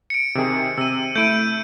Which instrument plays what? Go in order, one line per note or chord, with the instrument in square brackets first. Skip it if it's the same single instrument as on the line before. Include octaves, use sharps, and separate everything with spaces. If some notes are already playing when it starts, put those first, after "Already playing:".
[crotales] C#7 D7
[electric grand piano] C3 D#3 G#4
[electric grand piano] C3 [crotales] E6 D#7
[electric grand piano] A3 E4 [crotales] G6 D7 D#7